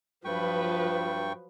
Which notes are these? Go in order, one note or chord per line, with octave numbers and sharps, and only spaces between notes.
G2 F3 F#3 B4 G5 C#6